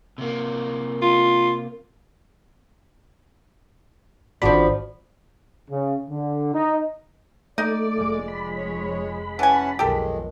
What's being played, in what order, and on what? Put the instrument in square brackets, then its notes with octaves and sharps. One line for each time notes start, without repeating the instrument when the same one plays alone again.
[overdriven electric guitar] C3 A#3
[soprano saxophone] F4
[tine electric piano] G#1 F#4 B5 [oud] F3 D4
[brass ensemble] C#3
D3
D#4
[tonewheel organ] A3 D6 [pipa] D#4 [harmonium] D5
[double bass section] F1 F2 G#3
[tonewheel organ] B5
[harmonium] C#5
[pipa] E3 G#5 [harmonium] C#4 F#5 A5
[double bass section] B1 F2 [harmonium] D#3 G#3 [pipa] G4 A4